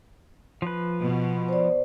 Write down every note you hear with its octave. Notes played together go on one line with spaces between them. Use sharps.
F3 B4
B2
C5 D5